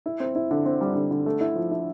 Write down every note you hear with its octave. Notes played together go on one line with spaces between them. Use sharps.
E4
C4
E4
D3
C4
G3
D3
D3
A3
E4
F3
E4